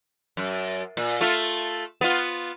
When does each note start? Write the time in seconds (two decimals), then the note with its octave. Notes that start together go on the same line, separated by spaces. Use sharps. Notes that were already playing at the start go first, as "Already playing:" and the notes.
0.37 F#2
0.97 A#2
1.21 A3 F4
2.01 B3 F4